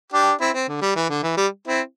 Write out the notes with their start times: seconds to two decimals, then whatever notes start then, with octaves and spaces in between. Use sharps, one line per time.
0.13 D4 G4
0.41 C4 E4
0.54 C4
0.68 D3
0.81 G3
0.96 E3
1.09 D3
1.23 E3
1.37 G3
1.68 C4 E4